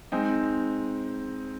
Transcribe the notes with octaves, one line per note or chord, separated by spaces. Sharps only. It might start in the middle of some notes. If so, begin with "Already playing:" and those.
G#3 C4 D#4